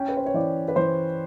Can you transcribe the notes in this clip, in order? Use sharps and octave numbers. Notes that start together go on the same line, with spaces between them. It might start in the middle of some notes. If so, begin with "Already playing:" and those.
Already playing: C#4 G5
B4
C5
C#5
E3 D5
B4
E3 C5